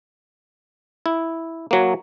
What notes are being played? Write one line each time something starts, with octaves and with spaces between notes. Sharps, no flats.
E4
F#3 A#3